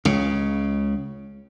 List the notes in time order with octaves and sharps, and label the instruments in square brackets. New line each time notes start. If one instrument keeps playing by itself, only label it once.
[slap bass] C#2 C#3